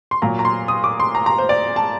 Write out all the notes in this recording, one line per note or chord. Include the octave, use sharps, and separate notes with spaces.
C6
A#2 F#3 A#5
A#5
C6
D#6
D6
C6
A#5
A#5
C5
D5
A5